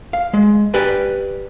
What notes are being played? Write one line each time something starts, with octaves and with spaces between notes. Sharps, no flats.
F5
G#3
G4 B4 D5 G#5